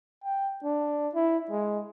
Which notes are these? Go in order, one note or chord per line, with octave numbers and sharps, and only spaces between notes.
G5
D4
E4
G#3